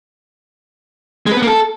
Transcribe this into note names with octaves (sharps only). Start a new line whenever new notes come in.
G#3
B4
B3
A#3
A4